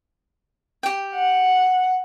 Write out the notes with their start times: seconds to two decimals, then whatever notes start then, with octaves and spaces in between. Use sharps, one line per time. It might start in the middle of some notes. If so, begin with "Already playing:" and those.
0.83 G4 G5
1.15 F#5